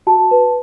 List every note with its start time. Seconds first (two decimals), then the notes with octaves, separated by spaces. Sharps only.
0.07 F#4 A5
0.31 B4